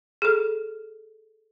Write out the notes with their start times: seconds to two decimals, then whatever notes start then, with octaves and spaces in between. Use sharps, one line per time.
0.22 G#4 A4